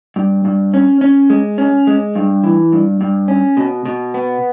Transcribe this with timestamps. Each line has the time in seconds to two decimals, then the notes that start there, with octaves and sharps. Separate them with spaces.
0.16 G2
0.45 G2
0.74 C#4
1.01 C#4
1.30 G#3
1.58 C#4
1.87 G#3
2.15 G2
2.44 E3
2.72 G2
3.01 G2
3.28 C#4
3.57 B2
3.85 B2
4.14 B3